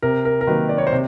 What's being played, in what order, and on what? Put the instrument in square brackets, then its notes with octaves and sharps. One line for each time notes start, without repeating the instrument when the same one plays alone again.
[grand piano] C3 A#4
A#4
A#4
D#3 F#3 A#3 B4
D5
C#5
C5
C3